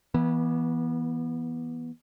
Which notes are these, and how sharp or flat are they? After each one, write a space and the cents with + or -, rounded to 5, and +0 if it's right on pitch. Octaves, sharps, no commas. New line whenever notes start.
E3 +0 B3 -25